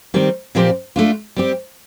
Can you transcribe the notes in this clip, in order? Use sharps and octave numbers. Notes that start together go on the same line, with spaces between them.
D#3 G3 C4
A#2 F3 C4 G4 D5
A3 D4 F4
G3 C4 G4